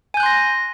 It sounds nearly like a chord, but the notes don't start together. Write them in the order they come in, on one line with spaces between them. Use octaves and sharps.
G#5 G6 F#6 C6 A#6